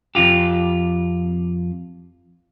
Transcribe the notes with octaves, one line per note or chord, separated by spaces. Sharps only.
F2 A#2 F4 G4